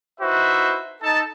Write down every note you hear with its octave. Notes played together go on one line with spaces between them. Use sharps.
D#4 E4 F#4 B4 C5 E5
D#4 A4 A5